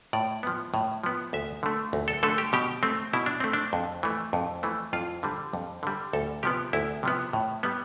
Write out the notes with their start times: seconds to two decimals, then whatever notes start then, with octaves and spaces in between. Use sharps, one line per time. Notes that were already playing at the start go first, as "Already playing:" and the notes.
0.13 A2 D5
0.43 F3 B3
0.74 A2
1.04 F3 B3
1.33 D2 E5
1.63 D3 A3
1.93 D2
2.08 A4
2.23 D3 A3 A4
2.38 G4
2.53 B2 G4
2.83 A3 C4
3.13 B2 E4
3.26 D4
3.40 A3 C4
3.53 D4
3.73 F2
4.03 E3 A3
4.33 F2
4.63 E3 A3
4.93 F2 F4
5.23 D3 G3
5.53 F2
5.83 D3 G3
6.13 D2 A4
6.43 C3 F3 B3 G4
6.73 D2 E4
7.03 C3 F3 B3
7.33 A2
7.63 G3 B3